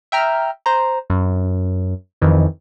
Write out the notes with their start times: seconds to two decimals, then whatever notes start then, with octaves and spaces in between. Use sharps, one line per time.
0.12 E5 G5 A#5 F6
0.66 C5 A#5
1.10 F#2
2.22 F2 D#3 E3